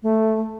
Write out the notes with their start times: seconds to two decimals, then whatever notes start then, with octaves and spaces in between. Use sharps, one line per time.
0.03 A3